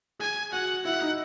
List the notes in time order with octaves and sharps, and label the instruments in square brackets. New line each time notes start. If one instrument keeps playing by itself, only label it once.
[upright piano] G#4 [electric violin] G#5
[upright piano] F#4 [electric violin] F#5
[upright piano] E4 [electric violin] F#5
[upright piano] D#4